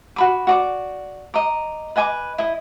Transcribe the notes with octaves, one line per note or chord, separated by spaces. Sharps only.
F#4 B5 D6
F#4 D5 D6
D#5 A#5 D6
B4 D#5 G#5 D6
E4 D#5